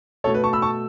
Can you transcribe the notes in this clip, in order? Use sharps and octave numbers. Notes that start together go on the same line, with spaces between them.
B2 A3 A4 C#5
B4
A5 C#6
B5 E6
A5 C#6